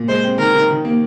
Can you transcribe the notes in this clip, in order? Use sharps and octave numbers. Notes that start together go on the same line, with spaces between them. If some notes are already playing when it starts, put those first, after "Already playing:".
Already playing: A#2
G#3 C5
C4
D#3 A#4
D#3
D#3
A#3